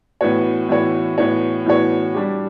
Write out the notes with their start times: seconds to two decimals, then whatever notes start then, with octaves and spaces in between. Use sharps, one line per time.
0.21 A2 E3 B3 F#4 C#5
0.69 A2 E3 B3 F#4 C#5
1.18 A2 E3 B3 F#4 C#5
1.66 A2 E3 B3 F#4 C#5
2.14 G3 D4 G4